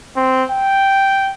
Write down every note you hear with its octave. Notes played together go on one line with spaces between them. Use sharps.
C4
G5